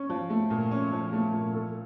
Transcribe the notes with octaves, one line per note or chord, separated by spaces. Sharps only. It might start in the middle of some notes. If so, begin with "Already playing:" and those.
Already playing: C#4
F3
A3
A#2
C#4
F3
A3
A#2
A4